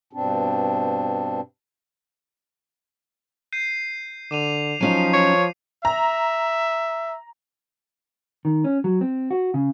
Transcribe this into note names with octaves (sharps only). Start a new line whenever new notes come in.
G2 B2 C4 D4
G6 C7 D#7
D3 D6 D#7 F7
F3 F#3 C#4 D#4 C7 D#7
C#5
E5 A#5
D#3
C#4
F#3
C4
F#4
C#3